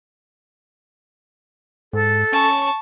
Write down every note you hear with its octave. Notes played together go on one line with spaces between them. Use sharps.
G#2 A4
C#4 A5 C#6